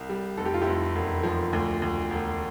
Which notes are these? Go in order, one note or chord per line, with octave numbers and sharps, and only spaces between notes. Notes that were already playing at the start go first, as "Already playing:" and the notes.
Already playing: C2
G3
F1 A4
G4
F4
E4 G4
F1
E1
F3
D2
D2
E1